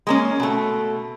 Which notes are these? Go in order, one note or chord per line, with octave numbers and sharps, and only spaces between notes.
G#3 A#3 C#4
B2 A3